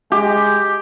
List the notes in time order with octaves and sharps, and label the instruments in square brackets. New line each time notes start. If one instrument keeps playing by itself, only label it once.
[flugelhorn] G#3 [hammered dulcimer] G4